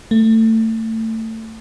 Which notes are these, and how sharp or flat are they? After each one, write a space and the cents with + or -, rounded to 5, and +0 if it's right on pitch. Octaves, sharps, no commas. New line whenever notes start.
A3 +25